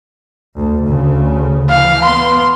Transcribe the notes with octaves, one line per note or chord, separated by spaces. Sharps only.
D2
D2 C#3
E3 F5
B3 C6